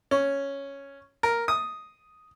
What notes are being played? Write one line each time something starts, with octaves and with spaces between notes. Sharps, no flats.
C#4
A#4
D#6